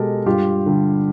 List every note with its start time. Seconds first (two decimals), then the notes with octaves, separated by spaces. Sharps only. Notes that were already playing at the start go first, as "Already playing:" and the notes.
Already playing: B2 G#3 G4 A4 A#4
0.26 G2 F4 G4
0.66 D3 G3